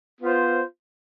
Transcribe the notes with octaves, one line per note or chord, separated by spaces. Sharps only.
B3 F4 C5